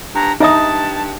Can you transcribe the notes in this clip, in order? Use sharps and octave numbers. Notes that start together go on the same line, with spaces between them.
G2 A#5
G2 D#4 E4 E5 A5 D#6